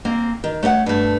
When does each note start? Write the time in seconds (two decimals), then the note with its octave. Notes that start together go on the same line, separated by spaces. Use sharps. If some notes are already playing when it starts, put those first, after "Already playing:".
0.05 A#3 C4
0.44 D#3
0.63 A3 C#5 D5 F#5
0.86 G2 A3